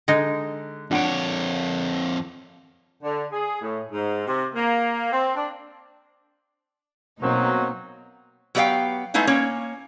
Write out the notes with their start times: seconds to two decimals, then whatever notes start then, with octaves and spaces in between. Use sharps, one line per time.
0.08 D3 G#3 D#4
0.91 F2 D4 C#5 F#5 D7
3.03 D3
3.32 G#4
3.61 A2
3.91 G#2
4.27 C3
4.54 A#3
5.12 C4
5.35 D4
7.22 B2 F#3 A#3 C4 D#4
8.55 F#3 B3 G4 D5 F5 G5
9.14 G#3 A3 B3 D#4 E4 F5
9.27 A#3 C#4 C#5